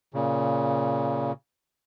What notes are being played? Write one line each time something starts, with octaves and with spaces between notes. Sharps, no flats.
A#2 C#3